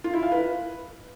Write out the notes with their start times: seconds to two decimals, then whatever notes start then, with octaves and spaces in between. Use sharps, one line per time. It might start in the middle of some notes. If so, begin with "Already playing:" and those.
0.04 F4
0.14 E4
0.23 F5
0.32 B4